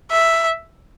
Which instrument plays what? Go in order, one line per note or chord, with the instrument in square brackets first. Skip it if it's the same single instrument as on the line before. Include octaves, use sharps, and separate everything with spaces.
[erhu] E5